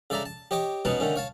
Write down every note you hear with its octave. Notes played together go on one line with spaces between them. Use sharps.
C#3 A4 D5 E5 A#5
A5
G4 C#5 D#5 G5 D6
B2 B3 C#4 D#4 F#4 A5
D3 D#3 A3 C#4
C#5 F5 A5